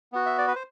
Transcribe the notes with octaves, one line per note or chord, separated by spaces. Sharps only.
B3 F#4
E5
D5
B4
C5